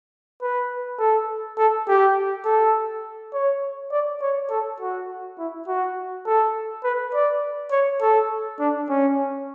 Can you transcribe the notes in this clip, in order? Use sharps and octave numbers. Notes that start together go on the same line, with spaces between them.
B4
A4
A4
G4
A4
C#5
D5
C#5
A4
F#4
E4
F#4
A4
B4
D5
C#5
A4
D4
C#4